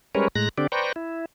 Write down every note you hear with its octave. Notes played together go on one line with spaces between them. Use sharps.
G3 G#3 C#4 A#4 B4 C#5
A2 G#3 A#5 F#6 A#6
D3 C4 D4 G4 D5
B4 C5 D5 G5 A#5 C#6
E4